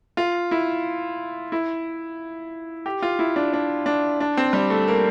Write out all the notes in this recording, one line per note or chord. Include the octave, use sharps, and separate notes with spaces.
F4
E4
E4
G4
F4
E4
D4
D4
D4
D4
C4
G3
A3
A#3